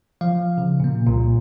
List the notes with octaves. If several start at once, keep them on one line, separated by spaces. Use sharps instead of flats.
F3 F5
C#3
A#2 A#3
C2 A#2